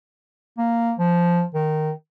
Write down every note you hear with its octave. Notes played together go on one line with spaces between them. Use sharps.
A#3
F3
D#3